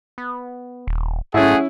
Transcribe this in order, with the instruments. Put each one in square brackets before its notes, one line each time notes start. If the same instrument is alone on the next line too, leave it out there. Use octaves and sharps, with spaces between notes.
[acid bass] B3
D#1
[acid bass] G#2 [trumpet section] A3 G#4 F#5 [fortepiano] C#4 E4